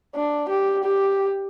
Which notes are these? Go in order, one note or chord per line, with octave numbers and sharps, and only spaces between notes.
D4
G4
G4